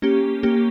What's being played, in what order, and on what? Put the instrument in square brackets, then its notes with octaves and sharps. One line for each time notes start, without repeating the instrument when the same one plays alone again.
[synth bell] A#3 C#4 G4
A#3 C#4 G4